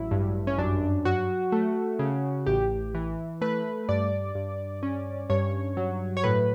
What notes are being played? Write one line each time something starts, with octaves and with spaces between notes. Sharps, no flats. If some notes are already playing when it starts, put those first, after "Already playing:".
Already playing: A1 F#3 E4
G2
C#4
F#2 D4
F#3 F#4
A3
C#3
A1 G4
E3
A3 B4
G2 D5
G2
C#4
G2 C#5
F#3
C#5
A2 B4